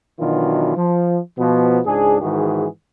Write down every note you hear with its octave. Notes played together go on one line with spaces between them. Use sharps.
B2 D#3 E3 F#3 D4 F4
F3
B2 F3 B3
C#2 G#2 D4 G#4
G#2 D#3 E3 F#4 G#4